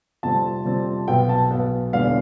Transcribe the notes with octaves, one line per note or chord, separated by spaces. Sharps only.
F2 C3 G3 C4 A5
F2 C3 G3 C4
B1 B2 B3 G5
A5
B1 B2 B3
E1 E2 D3 G3 B3 F5